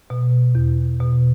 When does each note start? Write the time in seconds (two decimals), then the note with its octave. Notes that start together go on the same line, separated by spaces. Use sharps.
0.10 B2
0.55 E2
1.00 B2